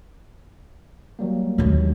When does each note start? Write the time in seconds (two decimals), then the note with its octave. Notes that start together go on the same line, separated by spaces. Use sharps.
1.19 F#3 G3 A#3
1.58 D#2 D3 F#3 G#3